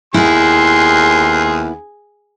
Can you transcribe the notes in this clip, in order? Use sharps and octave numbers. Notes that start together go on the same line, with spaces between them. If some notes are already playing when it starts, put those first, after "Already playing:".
D#2 B3 E4 G#4 C6